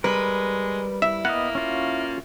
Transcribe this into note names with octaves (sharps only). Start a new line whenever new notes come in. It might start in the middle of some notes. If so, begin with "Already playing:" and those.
G3 G#3 A#4 B4
E4 E5
A#3 B3 D#5 F#5
C#4 F4 F#4